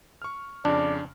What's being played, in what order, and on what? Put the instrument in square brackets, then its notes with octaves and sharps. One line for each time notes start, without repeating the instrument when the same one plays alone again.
[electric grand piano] C#6 F6
[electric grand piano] F2 C#3 [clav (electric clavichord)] D4 [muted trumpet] D5